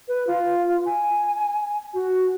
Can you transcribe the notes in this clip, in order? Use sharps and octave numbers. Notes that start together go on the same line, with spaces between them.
B4
F4
G#5
F#4